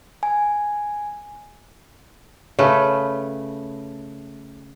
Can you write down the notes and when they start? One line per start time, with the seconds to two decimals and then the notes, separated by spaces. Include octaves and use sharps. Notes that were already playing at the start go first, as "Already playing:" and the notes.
0.23 G#5
2.59 C#3 A3 B4